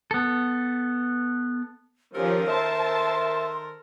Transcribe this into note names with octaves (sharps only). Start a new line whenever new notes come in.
B3 A4
D#3 F3 C#4 G4 A4 A#4
C5 E5 A5 C6